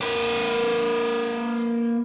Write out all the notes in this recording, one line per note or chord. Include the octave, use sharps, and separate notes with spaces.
A#3 B4